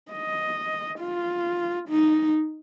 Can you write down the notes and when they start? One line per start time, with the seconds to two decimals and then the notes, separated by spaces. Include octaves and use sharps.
0.12 D#5
0.99 F4
1.89 D#4